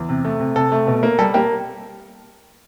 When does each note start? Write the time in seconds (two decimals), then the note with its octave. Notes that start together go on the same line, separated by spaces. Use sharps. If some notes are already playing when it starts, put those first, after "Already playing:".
Already playing: E2
0.09 C3
0.25 A3
0.40 C3
0.56 C3 A4
0.72 A3
0.87 B2
1.03 A#3
1.19 G3 A4
1.34 A#3 G4